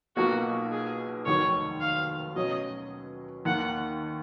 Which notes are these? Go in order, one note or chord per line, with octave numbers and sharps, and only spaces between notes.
B1 B2 A#3 F4 F#4
G#4
F1 D#2 D#3 F#3 C#5
F5
B2 F#3 C#4 D#5
D#2 D#3 A#3 F#5